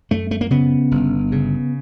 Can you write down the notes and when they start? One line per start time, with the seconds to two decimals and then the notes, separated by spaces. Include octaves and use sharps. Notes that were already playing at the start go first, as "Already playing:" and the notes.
0.11 F#2 A3
0.31 A3
0.41 A#3
0.50 C#3 B3
0.91 G1
1.32 C#3